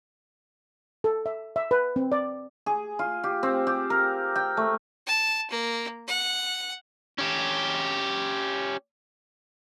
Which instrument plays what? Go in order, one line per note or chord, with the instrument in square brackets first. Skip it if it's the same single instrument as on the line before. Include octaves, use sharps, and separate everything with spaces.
[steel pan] A4
E5
E5
B4
C4
D5
[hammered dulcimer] G#4
F4
G4
C4
G4
A#4
G5
A3
[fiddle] A5
A#3
F#5
[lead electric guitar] C#4 G4